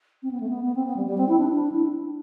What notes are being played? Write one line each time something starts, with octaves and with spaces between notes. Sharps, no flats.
C4
B3
A3
B3
B3
C4
B3
G3
G3
C4
E4
D4
D4
E4